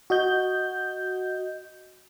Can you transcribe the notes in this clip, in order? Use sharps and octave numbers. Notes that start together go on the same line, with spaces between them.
F#4 D#5 G6